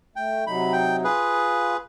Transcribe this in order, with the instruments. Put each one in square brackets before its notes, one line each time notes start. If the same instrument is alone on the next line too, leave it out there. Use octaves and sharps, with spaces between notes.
[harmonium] A3 [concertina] G5
[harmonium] C3 F#3 D#4 [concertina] B5
[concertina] G5
[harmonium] F4 [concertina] G#4 B4